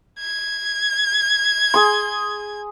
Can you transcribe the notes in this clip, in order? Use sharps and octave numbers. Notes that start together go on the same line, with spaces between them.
G#6
G#4 C6